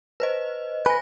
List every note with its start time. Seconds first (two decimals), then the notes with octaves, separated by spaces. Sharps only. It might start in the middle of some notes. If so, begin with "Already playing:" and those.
0.20 B4 C5 D#5
0.86 B4 G#5 A#6